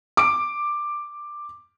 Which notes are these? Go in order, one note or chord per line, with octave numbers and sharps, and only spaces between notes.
D6 D7